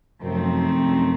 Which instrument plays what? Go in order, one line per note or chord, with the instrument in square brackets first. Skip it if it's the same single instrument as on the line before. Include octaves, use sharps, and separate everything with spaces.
[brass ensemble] F#2 [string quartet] C3 F3 A3 C4 D#4
[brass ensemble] F#2